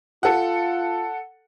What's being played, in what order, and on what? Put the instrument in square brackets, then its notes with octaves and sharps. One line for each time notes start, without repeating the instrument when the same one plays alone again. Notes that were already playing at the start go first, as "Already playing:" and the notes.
[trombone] F4 [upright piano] A4 F#5